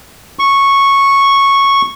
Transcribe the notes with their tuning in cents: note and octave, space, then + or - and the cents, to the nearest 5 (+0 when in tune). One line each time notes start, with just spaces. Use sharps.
C#6 -5